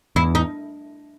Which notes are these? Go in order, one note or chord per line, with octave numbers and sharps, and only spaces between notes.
E2 E4
D#4